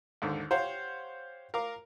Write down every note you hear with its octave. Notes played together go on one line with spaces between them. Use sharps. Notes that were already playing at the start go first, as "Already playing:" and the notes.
D#2 G#2 D3
G4 C5 C#5 F5 F#5
A#4 F5 D6